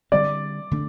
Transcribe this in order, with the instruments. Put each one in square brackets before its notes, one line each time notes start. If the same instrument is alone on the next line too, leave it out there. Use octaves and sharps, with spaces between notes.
[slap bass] D3 G3 C4 [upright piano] D5
[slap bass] D3 A3 D4